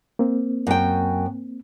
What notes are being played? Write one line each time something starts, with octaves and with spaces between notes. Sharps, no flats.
A#3 C4
F#2 G5